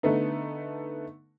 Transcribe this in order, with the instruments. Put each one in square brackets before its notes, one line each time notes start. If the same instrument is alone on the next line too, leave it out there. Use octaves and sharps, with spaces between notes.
[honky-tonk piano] D3 A3 B3 D#4